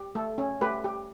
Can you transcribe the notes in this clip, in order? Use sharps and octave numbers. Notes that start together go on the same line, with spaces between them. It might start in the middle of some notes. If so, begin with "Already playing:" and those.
Already playing: G4
A3 A4
C#4
A3 G4 B4
G4